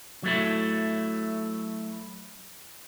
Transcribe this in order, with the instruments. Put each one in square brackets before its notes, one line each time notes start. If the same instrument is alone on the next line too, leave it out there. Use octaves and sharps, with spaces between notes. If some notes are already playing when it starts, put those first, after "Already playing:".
[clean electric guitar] F#3 A3 E4